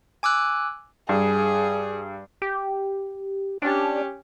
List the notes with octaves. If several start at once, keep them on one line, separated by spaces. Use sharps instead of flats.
G#5 D6 E6 F#6
G2 G#4
G4
C#4 D4 G4